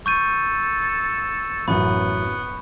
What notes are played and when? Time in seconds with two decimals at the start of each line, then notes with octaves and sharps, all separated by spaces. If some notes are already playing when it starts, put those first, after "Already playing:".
0.06 A4 C#6 G6 D#7
1.68 A1 F#2 B3 B5